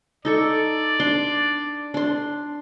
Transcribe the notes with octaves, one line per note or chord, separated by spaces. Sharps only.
D#4 A4 D5 C#6
D4 C6
D4 C6